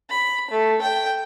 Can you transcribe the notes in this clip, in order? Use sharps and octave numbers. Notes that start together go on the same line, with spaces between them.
B5
A3
G5